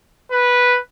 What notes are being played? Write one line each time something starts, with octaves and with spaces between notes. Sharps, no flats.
B4